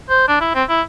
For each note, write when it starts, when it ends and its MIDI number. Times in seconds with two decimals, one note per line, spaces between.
0.09 0.24 72
0.28 0.36 62
0.41 0.51 64
0.55 0.63 60
0.69 0.81 64